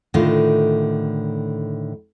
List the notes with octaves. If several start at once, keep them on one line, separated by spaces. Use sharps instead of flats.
A2 D3 D#3 D4 F4